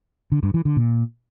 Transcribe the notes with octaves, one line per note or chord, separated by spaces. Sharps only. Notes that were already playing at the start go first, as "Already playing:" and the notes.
D3
G2
E3
D3
A#2